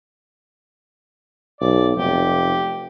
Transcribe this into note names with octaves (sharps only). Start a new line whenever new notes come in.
B1 D5
F1 G4